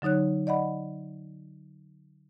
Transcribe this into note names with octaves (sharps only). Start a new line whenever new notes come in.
D3 F#3 D#4 C#5 F#6
D5 D#5 F#5 B5